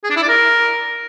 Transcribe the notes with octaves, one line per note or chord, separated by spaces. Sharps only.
G#4
D4
E4
D5
A#4